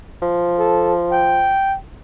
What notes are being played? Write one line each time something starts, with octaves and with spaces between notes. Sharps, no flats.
F3
A4
G5